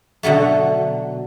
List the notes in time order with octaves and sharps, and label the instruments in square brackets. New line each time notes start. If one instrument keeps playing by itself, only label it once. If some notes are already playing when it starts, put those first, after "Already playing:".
[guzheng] B2 D3 F#3 A3